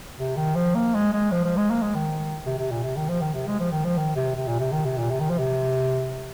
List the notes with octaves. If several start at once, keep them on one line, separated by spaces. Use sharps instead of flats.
C3
D#3
F3
A#3
G#3
G#3
F3
F3
G#3
A#3
G#3
D#3
C3
C3
A#2
C3
D#3
F3
D#3
C3
G#3
F3
D#3
F3
D#3
C3
C3
A#2
C3
D#3
C3
A#2
C3
D#3
F3
C3